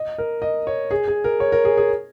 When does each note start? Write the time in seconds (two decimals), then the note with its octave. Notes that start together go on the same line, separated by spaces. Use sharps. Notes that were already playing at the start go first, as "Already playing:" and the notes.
Already playing: D#5
0.18 A#4
0.42 D#5
0.67 C#5
0.91 G#4
1.08 G#4
1.24 A#4
1.40 C#5
1.52 A#4
1.65 G#4
1.77 G#4